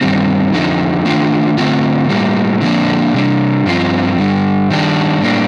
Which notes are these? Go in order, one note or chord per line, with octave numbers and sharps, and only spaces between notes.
G2 D#3 G3 C4
F2 D3 F3 D#4
D#3 A3 D4 F4
D3 A3 C4 F4
A2 G3 A#3
D3 F3 A#3 D4
C3 G3 D4
G2 F3 C4 F4
G2 D3 G3
D#3 G3 D4
A2 G3 A#3 D4